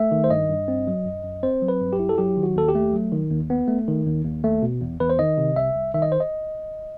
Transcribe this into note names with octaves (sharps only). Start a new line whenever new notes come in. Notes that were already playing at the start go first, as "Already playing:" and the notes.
Already playing: A3 E5
D#3
C5
G2 D#5
G2
C4
F#3
F#2
F#2
C4 C5
F#3
B4
G2
G4
E4
A4
F#3 G4
D#3
F#4
D#2 A4
G4
A3
F#3
D#3
D#2
B3
A3
D#3
D#2
D#2
A3
B2
E2
E2 B4
C5
D#3 D#5
C3
C2 E5
C2
D#3 E5
D#5
C5
D#5